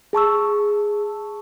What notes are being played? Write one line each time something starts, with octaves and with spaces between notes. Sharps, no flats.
G#4 A5 C#6 E6